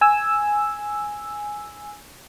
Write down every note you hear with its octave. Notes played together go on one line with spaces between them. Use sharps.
G#5 E6